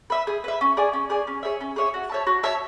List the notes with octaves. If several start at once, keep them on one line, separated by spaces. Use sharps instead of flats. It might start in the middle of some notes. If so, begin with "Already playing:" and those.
B4 E5
G#4
B4 E5
C#4
G#4 D5 G#5
C#4
G#4 D5 G#5
C#4
G#4 C#5 E5
C#4
G#4 C#5 E5
F#4
C#5 E5 A5
F#4
C#5 E5 A5